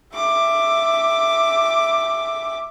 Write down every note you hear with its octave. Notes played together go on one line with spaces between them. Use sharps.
E5 D6